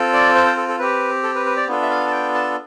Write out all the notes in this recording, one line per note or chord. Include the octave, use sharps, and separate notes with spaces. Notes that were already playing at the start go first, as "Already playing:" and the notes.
Already playing: C4 F4 A4
D5
C5
C5
A4
A4
C4 G4 B4
A4
B4
B4
D5
B3 D4 F4 A4
E5
F5
A5
G5
A5